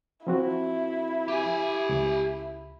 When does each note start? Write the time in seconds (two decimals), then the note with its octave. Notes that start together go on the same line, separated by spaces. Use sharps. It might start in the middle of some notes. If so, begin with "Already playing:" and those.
0.27 F3 C4 E4 F#4
1.28 G4 G#5
1.89 C#2